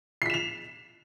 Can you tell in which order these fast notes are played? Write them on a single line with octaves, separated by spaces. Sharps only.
C7 B6 E7 F7